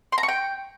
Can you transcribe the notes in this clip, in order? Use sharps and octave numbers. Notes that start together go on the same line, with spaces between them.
C6
A#5
C#6
G5